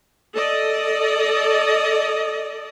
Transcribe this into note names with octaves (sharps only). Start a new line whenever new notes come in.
A4 D5 D#5